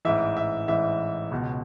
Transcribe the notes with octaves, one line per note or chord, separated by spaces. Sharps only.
A1 G#2 E3 E5
E5
A1 G#2 E3 E5
C#2 B2